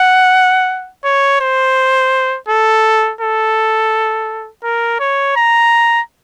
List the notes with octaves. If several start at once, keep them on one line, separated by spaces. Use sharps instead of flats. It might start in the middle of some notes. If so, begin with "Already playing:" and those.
Already playing: F#5
C#5
C5
A4
A4
A#4
C#5
A#5